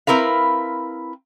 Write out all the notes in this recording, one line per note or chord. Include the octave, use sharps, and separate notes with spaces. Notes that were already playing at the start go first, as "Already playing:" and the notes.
C4 E4 A#4 B4 F5